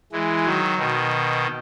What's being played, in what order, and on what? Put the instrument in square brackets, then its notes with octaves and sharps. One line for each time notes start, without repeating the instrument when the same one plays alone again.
[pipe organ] E3 G#3
D#3 F#3
B2 D#3